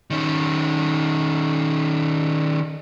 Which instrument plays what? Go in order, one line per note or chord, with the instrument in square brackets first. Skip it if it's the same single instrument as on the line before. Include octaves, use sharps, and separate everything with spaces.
[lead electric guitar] D#3 C#4